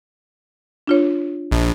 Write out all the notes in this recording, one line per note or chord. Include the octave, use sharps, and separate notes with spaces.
D4 F4 C#5
A#1